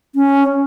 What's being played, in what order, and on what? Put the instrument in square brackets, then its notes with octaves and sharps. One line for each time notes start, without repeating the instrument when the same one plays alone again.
[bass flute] C#4